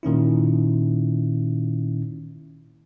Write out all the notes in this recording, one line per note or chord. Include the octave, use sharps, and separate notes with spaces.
A#2 D#3 C#4 E4